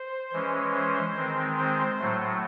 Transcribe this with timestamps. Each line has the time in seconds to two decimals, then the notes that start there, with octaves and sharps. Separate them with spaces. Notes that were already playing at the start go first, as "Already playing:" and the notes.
Already playing: C5
0.33 E3 G#3 C#4
0.74 C5
1.16 D#3 G#3 C4
1.58 C5
2.00 A2 F#3 A3